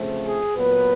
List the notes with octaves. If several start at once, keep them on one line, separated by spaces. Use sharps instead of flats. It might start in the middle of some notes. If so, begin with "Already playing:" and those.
Already playing: C#3 F3 A3 C4
G#4
A#2 F#3 B3 B4